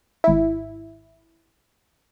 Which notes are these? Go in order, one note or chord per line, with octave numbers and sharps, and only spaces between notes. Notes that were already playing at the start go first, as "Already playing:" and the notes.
G#1 E4